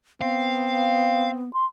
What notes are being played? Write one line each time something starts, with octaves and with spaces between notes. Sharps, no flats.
B3 C4 F5
C6